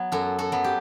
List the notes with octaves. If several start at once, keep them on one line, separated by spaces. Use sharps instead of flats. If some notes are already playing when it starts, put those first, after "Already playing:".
Already playing: F#3 B3
F#2 F#4 A4
F#4 A4
F#3 B3
G4